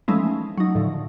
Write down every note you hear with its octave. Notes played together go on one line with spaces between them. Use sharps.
E3 F3 G#3 A3 C#4 D#4
F#3 D#4
A2 D3 F3